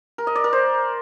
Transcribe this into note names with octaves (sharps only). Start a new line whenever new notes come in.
A#4
D#5
D5
A#4
C5